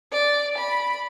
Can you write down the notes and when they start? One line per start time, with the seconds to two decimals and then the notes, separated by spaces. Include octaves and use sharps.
0.12 D5
0.57 B5